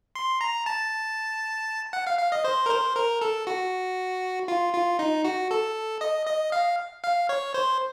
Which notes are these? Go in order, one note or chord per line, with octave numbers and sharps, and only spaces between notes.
C6
A#5
A5
F#5
F5
F5
D#5
C5
A#4
C5
A#4
A4
F#4
F4
F4
D#4
F#4
A4
D#5
D#5
F5
F5
C#5
C5